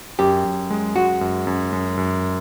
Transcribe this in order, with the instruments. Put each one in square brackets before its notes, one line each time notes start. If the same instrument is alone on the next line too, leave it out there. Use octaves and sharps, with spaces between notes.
[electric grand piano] F#2 [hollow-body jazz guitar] G4
[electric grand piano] F#2
G#3
[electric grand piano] G#3 [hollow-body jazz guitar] F#4
[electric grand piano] F#2
F#2
F#2
F#2